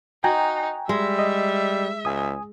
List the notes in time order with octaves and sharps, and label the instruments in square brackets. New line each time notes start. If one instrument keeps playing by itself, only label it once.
[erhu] D#4 [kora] F#4 [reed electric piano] G5 G#5 A#5
[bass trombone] G3 [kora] G#3 [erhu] E5
[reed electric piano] D#5
[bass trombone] C#2 [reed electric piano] G#5 D#6